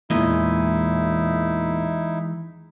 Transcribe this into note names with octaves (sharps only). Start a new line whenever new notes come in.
E2 A#2 E3 G#3 D#4 E4 D#5